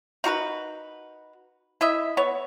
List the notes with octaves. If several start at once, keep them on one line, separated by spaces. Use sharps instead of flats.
D#4 F#4 A#4 B4
E4 D#5 E5
B3 C#5